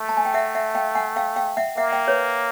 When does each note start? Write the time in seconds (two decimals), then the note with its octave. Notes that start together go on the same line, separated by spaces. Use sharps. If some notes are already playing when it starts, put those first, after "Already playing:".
Already playing: A3
0.09 A5
0.17 G#5
0.25 G5
0.34 E5 F#5
0.55 E5 F#5
0.75 F5 G5
0.95 F#5 G#5
1.16 F5 G5
1.36 F5 G5
1.57 E5 F#5
1.77 A#3 E5 F#5
1.92 F5 G5
2.08 B4 C#5